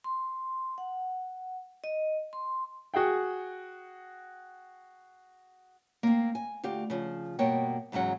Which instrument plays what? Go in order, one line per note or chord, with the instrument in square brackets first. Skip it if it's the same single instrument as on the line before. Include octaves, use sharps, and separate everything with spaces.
[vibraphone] C6
F#5
D#5
C6
[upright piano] F#4 G#4 F#5 G5
[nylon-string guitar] A#3 C4
G#5
D2 F4 G4
C#3 F3
G2 B2 A#3 C#5 G5
E2 G#2 C#3 F#3 F#5